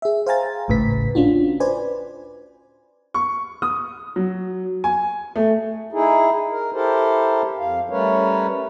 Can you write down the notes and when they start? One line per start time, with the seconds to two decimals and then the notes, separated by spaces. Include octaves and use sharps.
0.02 G#4 E5
0.26 C5 F5 G5 G#5 A#5 A6
0.68 G#1 C#2 A2 C#3 B4 B6
1.15 C#4 D4 F4 F#4
1.60 B4 C5 D5 G#5
3.14 C#6
3.62 D#6
4.16 F#3
4.84 G#5
5.36 A3
5.93 D#4 E4 G#4
6.51 A#4
6.73 E4 G4 A4 A#4 C5
7.58 F2 F5
7.90 G3 A3 C#4 A#4 B4 C#5